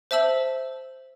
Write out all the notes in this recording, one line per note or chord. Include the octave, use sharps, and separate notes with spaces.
C5 E5 A5 E6 F#7